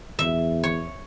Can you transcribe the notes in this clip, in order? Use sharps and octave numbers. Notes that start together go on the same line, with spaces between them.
E2 E5
C#5